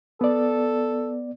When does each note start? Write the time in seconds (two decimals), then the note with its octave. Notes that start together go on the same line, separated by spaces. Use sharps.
0.21 B3 A4 D5